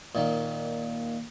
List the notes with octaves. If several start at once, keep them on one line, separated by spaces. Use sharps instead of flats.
A#2 D#3 A#3